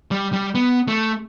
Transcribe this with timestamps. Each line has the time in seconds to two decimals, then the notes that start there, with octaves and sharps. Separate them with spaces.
0.11 G3
0.33 G3
0.55 B3
0.88 A3